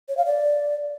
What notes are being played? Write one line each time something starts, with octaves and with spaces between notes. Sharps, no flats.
C#5
F5
D5